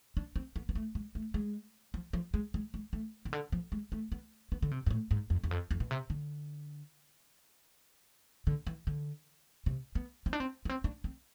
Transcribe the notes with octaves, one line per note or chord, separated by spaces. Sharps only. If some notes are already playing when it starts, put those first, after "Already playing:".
D4
C4
B3
B3
A3
G#3
A3
G#3
F3
F3
G#3
G#3
G#3
A3
C3
D3
F3
G#3
A3
B3
B3
D3
C3
G#2
A2
G#2
F2
E2
F2
F2
B2
C3
D3
D3
E3
D3
C3
B3
C4
D4
C4
B3
C4
D4
C4